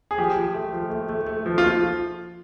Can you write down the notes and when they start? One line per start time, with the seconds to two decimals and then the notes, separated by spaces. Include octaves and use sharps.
0.11 G#4
0.18 F3 G4
0.36 F3
0.54 A3
0.73 F3
0.90 A3
1.09 A3
1.26 A3
1.46 F3
1.58 F4